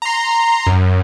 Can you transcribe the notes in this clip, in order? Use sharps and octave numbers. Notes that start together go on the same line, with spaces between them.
A#5 C6
F#2